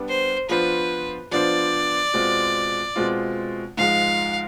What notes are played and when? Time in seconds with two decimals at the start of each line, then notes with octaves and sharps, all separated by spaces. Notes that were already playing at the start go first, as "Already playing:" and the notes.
Already playing: G3 B3 D4
0.09 C5
0.49 F3 B3 D4 F4 B4 C5
1.32 F3 B3 D4 F4 C5 D5
2.14 B2 G#3 C4 F4
2.96 B2 G#3 C4 F4
3.77 G#2 F3 G#3 F5